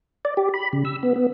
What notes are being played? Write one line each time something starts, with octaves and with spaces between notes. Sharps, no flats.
D5
G4
B5
C#3
E6
B3
B3